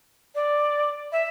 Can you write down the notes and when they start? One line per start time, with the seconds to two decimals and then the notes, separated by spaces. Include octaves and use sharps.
0.34 D5
1.11 E5